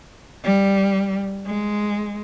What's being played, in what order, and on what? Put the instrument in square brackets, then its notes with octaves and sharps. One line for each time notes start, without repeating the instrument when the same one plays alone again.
[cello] G3
G#3